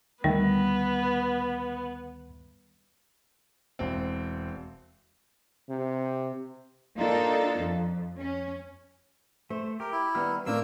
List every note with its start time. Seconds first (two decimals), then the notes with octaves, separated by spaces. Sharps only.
0.24 D2 D#3 G3 B3 E5
3.79 E1 C4
5.69 C3
6.98 A#3 D4 D#4 F4 A4
7.60 F2
8.20 C#4
9.50 A3 C5
9.80 G4 A#4
9.92 E4
10.15 D#3 G3 B3 F6
10.46 A2 A3 A#3 C4 D4 F4 E6